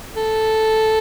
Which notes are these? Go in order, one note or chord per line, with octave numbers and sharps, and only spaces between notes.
A4